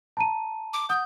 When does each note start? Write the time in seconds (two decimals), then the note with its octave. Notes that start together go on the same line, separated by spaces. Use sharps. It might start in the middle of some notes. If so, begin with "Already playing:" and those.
0.17 A5 A#5 D#7
0.73 D6
0.89 F#5 D#6 G6